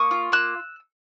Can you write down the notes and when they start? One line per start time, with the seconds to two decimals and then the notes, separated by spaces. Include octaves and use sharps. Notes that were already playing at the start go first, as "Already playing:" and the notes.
Already playing: A#3 C#6 D#6
0.11 F4
0.32 A#3 E6 F#6